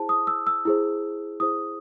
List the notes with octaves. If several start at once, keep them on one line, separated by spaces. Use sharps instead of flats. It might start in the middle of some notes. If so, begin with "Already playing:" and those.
Already playing: E4 G#4 C5 A5
D#6
E6
E6
E4 G#4 C5
E4 G#4 C5 D#6